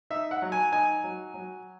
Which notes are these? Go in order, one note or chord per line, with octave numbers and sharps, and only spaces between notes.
D#4 E5
F#5
F#3
G#5
D#4 G#5
F#3
F#3